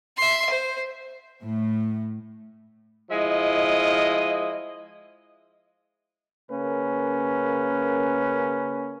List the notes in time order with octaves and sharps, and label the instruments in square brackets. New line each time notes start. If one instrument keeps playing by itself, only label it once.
[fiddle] E5 C6
C5
[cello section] A2
[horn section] F3 G#3 E4 D#5
[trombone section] C#3 A#3 C#4 A#4 B4